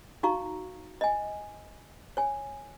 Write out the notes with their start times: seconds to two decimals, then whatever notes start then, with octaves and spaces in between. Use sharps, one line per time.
0.23 D#4 F#4 F5 A#5 C#6
1.01 D#5 G#5
2.17 C#5 G#5